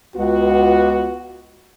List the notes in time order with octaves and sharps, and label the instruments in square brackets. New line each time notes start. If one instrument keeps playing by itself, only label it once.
[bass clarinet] C#2 [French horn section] B3 F4 F#4